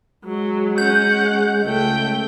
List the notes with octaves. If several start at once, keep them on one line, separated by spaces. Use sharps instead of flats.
F#3 G#3
C#4 F#5 G6
C#2 A3 G5